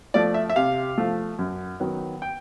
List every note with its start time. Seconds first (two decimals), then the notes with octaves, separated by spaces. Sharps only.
0.14 F3 A3 D5
0.34 E5
0.50 E5
0.56 C3 F5
0.98 F3 A3
1.39 F#2
1.80 D#3 F#3 B3
2.22 G5